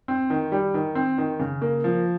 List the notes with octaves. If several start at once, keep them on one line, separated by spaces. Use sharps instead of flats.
C4
D#3
G3
D#3
C4
D#3
C#3
A#3
F3